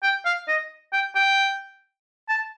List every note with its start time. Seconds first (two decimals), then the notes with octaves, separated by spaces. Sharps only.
0.03 G5
0.26 F5
0.48 D#5
0.93 G5
1.16 G5
2.29 A5